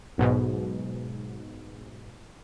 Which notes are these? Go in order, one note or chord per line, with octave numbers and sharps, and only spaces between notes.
B1 G#2 B2